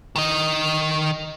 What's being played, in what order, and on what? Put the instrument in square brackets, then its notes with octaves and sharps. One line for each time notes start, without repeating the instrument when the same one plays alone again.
[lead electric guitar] D#3 D#5